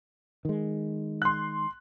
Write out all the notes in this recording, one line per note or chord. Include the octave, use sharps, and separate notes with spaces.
D#3 G#3
C6 F#6